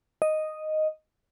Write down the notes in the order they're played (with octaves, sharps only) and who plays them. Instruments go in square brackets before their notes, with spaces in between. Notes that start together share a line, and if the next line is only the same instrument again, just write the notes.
[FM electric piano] D#5